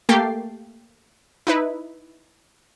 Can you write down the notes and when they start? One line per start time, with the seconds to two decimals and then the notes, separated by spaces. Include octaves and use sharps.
0.09 A3 A#3 G4 G5 A6 C7
1.47 D#4 E4 B4